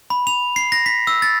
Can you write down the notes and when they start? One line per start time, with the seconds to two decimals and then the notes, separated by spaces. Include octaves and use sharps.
0.10 B5
0.27 F7
0.56 C7
0.72 A#6
0.86 B6
1.07 E6
1.22 A6